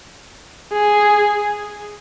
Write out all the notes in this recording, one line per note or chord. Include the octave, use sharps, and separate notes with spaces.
G#4